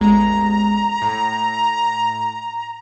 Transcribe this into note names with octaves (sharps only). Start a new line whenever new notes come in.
A1 E2 G#3 A#5
A2